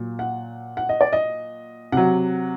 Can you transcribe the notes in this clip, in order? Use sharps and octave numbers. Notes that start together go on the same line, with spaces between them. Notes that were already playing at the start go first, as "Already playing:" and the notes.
Already playing: A#2 F#3
F#5
F#5
D#5
D5
D#5
C3 F#3 F#5